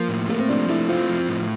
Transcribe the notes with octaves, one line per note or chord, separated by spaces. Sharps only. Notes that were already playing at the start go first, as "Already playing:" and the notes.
Already playing: F3 A#3
A2
A3 A#3
C4
F3 D4
A3 E4
C4 F4
F3
A2